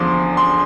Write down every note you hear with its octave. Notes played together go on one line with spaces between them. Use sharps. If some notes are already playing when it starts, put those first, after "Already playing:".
Already playing: E2 D3 F3 C6 D6
C6